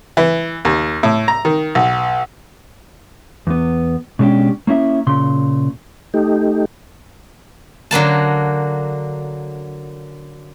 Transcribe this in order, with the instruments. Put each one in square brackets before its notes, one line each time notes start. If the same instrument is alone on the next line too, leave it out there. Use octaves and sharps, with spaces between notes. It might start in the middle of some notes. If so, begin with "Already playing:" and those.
[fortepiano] E3
D#2
A2
A#5
D#3
B1
[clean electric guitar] E2 B3
B2 G#3 C#4 D4 G4
A#3 C#4 E4 E5
A#2 C#3 C6
[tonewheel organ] A3 D#4 G4
[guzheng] D3 F#3 A#3 A5